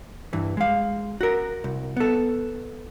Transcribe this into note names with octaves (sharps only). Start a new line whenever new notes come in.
G2 E3
G#3 F5
F#4 A#4
C2
B3 A4